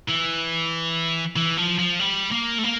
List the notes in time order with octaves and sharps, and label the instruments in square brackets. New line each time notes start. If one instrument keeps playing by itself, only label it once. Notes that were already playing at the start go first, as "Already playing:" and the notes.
[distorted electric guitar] E3
E3
F3
F3
G3
A#3
A3
A#3